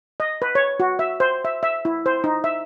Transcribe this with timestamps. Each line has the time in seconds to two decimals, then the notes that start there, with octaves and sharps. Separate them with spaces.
0.20 D#5
0.42 B4
0.55 C#5
0.80 F#4
0.99 E5
1.20 C5
1.45 E5
1.63 E5
1.85 E4
2.06 C5
2.24 D#4
2.44 E5